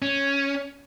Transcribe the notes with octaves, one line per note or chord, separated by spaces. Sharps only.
C#4